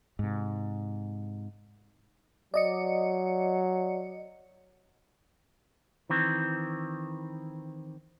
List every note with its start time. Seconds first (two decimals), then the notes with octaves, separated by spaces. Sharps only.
0.19 G#2 C3
2.54 F#3 D5 D#5 C#7
6.10 D#3 E3 C4